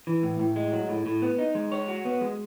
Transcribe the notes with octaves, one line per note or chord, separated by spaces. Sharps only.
E3
A2
A2
G#3
F#3
A2
A2
B3
D#4
G#3
C#5
F#4
B3
G#3